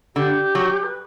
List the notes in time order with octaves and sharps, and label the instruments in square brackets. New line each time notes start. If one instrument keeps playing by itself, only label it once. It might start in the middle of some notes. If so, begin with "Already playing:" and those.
[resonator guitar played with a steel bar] D3 [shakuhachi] G4
[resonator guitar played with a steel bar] F#3
[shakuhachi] B4